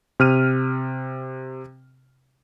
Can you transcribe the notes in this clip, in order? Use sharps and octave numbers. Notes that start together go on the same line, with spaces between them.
C3 F6 D#7